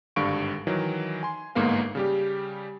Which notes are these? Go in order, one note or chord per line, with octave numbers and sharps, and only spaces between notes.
G#1 G2 D3 F5 C#6 D7
D#3 E3 F#3
G#5 C6
G1 G#2 A#3 B3 A#4 F5
C#3 G3 G4